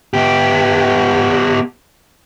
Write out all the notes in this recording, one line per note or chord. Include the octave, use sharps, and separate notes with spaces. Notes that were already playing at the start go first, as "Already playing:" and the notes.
B3 G4